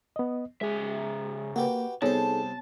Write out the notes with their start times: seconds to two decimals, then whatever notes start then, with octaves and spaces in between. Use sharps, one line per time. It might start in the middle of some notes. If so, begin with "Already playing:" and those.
0.16 B3 D#5
0.61 C#3 G#3 G#4 E5
1.56 A#3 F#4 G4 B4
2.02 C2 B3 D#4 G#4 A4 C5 C#5 A5